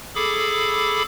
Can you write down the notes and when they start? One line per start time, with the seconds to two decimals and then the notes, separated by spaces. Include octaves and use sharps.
0.15 G#4 A4 B5 D6